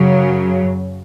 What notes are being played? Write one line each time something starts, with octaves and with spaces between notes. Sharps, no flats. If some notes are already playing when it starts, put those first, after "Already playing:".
Already playing: F#2 C#3 F#3